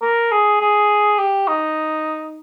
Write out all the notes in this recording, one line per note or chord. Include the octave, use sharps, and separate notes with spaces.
A#4
G#4
G#4
G4
D#4